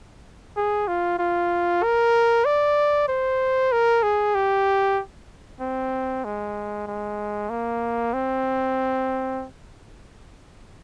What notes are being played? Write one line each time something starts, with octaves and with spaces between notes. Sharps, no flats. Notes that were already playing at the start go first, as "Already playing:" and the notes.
G#4
F4
F4
A#4
D5
C5
A#4
G#4
G4
C4
G#3
G#3
A#3
C4